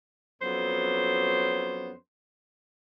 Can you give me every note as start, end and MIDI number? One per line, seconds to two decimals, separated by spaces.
0.42 1.92 41
0.42 1.92 54
0.42 1.92 59
0.42 1.92 61
0.42 1.92 72